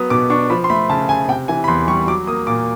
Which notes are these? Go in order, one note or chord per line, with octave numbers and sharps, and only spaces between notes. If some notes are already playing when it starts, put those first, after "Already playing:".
Already playing: F#3 B3 D#6
B2 D6
D4 C#6
F3 B5
C6
A3 B5
C#3 A5
C#3 G#5
C3 G5
E3 G#5
B5
E2 C6
G3 C#6
F#3 D6
A#3 D#6
A#2 D6